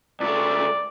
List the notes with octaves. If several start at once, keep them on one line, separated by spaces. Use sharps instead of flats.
C#2 A3 D5